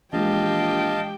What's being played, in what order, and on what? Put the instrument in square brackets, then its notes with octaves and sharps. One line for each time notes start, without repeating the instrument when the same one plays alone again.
[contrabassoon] A#1 [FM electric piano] E3 G#3 [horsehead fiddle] G4 G5 [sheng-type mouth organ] D#5 F5 A5